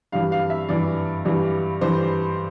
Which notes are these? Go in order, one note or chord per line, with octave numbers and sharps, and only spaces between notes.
G2 E3 G3 F5
F5
E5
G2 E3 G3 D5
G2 E3 G3
G2 E3 G3 C5